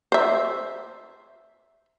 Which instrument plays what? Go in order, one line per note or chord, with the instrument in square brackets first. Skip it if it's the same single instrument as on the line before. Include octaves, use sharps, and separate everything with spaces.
[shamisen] C5 E5